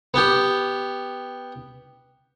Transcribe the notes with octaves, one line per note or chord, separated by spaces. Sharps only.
B3 G4